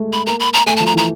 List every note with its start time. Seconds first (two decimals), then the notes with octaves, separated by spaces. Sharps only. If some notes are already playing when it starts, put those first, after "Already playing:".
Already playing: G#3 A3
0.13 B5
0.26 A#3 A#5
0.40 B5
0.53 A#5
0.66 A3 G#5
0.77 A5
0.80 F3
0.86 A#5
0.94 E3
0.97 A#5